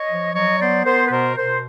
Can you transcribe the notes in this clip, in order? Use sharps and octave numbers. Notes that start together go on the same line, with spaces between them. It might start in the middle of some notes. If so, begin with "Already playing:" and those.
Already playing: C#5 D#5
F3
F#3 C#5 D#5
B3 C5 D5
B3 A#4 C5
B4
B2 A#4 C5
B2 A#4 C5